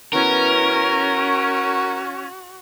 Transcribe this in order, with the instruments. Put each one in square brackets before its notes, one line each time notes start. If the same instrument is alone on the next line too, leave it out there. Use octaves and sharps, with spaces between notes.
[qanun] E3 B3 [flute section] C#4 [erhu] F#4 [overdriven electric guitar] A#4